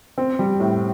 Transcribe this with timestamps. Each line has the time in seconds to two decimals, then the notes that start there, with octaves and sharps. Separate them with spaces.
0.18 C4
0.39 G3
0.60 A2